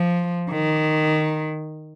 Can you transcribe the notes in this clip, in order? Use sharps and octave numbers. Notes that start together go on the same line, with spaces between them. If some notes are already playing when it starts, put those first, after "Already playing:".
Already playing: F3
D#3